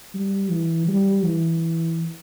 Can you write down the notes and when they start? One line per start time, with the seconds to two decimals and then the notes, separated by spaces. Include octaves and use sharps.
0.14 G3
0.51 E3
0.88 G3
1.24 E3